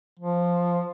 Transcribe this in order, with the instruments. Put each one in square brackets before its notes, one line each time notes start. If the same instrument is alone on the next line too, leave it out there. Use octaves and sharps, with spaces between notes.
[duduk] F3